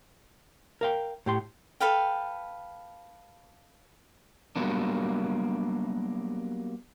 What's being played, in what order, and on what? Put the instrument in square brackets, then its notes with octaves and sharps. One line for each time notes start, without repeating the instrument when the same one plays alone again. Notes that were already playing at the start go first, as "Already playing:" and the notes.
[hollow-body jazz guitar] A#4 F5 G5
A2 G4 C6
[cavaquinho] A4 B4 F5 G5
[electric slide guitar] F#3 G3 A#3 B3 D4